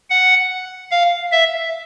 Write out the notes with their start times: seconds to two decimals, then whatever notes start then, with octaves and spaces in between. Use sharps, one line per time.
0.10 F#5
0.91 F5
1.32 E5